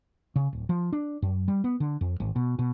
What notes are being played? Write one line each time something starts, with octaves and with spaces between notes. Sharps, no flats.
C#3
D1
F3
D4
F#2
G3
B3
D3
F2
G#1
B2
B2